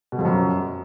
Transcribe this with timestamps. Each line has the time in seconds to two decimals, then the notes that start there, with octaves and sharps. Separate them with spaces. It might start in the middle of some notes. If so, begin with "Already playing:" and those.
0.12 B2
0.19 F2
0.25 F#2